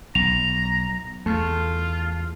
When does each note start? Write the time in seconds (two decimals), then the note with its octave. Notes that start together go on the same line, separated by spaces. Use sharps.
0.15 B1 A#5 F7
1.26 E2 A3 F4